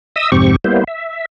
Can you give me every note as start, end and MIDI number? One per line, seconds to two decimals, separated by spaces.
0.16 0.31 75
0.16 0.31 76
0.16 0.31 87
0.16 0.31 88
0.32 0.56 41
0.32 0.56 44
0.32 0.56 48
0.32 0.56 60
0.32 0.56 67
0.32 0.56 85
0.64 0.84 55
0.64 0.84 58
0.64 0.84 59
0.64 0.84 64
0.64 0.84 72
0.87 1.25 76